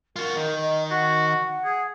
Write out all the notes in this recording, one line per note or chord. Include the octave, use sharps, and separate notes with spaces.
F4 F#4 A#4
D#3
D#5
F#4 F#5
F#5
G#4